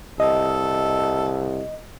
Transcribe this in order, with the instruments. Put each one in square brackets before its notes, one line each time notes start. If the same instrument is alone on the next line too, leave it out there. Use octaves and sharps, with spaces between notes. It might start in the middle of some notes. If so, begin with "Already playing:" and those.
[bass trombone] C2 [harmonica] A4 [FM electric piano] D#5